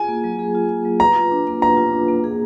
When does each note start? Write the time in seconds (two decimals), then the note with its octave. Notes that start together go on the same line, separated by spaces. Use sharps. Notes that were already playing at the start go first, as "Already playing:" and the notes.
Already playing: F4 G#4 G#5
0.08 A#3
0.24 F#3
0.39 G#4
0.55 F4
0.70 A#3
0.85 F#3
1.00 B4 A#5
1.16 F4
1.31 D4
1.47 A#3
1.62 B4 A#5
1.77 F4
1.93 D4
2.08 A#3
2.24 G#4